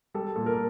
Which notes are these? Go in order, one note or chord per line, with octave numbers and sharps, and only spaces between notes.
G3 A4
A#2 A4
A#4